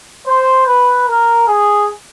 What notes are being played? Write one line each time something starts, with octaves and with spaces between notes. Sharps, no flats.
C5
B4
A#4
G#4